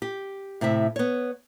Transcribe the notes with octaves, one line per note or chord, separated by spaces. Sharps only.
G4
A2 C3 E4 E5
B3 C#5